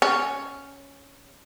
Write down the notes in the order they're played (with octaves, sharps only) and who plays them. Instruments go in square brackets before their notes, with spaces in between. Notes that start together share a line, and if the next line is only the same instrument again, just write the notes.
[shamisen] C#4